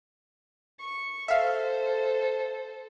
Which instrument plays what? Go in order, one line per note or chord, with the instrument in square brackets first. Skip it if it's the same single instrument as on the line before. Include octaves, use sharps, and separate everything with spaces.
[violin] C#6
[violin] A4 C5 [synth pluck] E5 F5